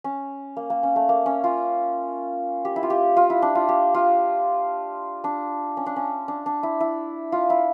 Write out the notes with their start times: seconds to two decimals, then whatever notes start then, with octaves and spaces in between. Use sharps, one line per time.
0.04 C#4
0.57 A#3
0.70 A#3
0.83 C#4
0.96 A3
1.09 A#3
1.26 C#4
1.44 F4
2.65 G4
2.76 E4
2.83 F4
2.90 G4
3.17 F4
3.30 E4
3.42 D4
3.55 F4
3.69 G4
3.94 F4
5.24 D4
5.77 C#4
5.86 D4
5.96 C#4
6.28 D4
6.46 D4
6.63 E4
6.80 E4
7.32 F4
7.50 E4